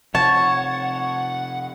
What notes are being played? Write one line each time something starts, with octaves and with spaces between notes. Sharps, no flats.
C3 F3 C#5 F#5 A5